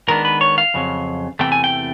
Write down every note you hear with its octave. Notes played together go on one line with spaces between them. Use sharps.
D#3 G#3 B3 D4 A#4
B4
C#5
F5
F2 C#3 F#3
E2 C3 E3 A3 G5
G#5
G5